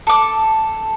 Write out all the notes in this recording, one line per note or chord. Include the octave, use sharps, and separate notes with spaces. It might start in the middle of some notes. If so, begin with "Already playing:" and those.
A4 D6